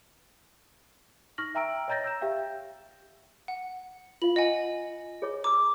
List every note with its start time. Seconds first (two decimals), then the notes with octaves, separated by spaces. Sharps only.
1.38 D#4 C#6 F6 A#6 F#7
1.55 E5 G5 A#5 E6 D7
1.88 C#5 D#5 A#5 G6 A6 A#6
2.04 E6 G6 E7
2.21 G4 E5 F5 G5
3.48 F#5
4.22 F4 F5 F#7
4.36 D#5 F#5 G#5
5.22 G#4 C#5 D6
5.44 A#5 D6 E6